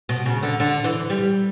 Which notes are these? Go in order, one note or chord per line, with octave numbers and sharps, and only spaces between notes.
B2
C#3
D3
D3
E3
G3